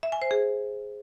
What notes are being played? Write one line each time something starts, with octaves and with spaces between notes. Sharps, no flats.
E5
G#5
C5
G#4